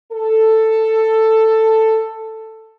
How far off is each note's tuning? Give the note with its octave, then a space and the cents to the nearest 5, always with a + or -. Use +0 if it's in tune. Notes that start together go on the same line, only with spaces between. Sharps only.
A4 +10